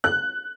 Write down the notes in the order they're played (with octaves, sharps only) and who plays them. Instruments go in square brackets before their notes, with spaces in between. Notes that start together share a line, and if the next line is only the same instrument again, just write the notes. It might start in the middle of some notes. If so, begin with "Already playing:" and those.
[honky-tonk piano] F#6